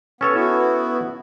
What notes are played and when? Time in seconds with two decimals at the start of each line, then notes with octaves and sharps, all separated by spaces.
0.21 B3 C#4 A4 C#5
0.35 B3 E4 F#4